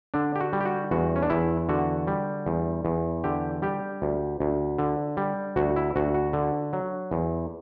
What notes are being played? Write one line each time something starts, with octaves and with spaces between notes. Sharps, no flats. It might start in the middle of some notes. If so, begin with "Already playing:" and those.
D3 D4
G4
F#4
G3
G4
F#4
E2 F#4
C#4
D4
E2 E4
D3 F#4
G3
E2
E2
D3 G4
G3 G4
D2
D2
D3
G3
D2 F#4
E4
D2 F#4
F#4
D3
F#3
E2